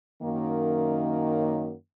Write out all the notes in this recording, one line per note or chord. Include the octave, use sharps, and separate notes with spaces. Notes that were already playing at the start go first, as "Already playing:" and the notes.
F#2 D#3 A#3